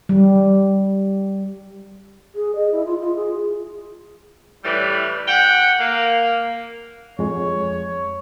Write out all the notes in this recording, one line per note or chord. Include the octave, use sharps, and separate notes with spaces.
G3
G#4
D#5
E4
F4
F4
G#4
A2 E3 G3
F#5 G5
A#3
F2 G#3 C#5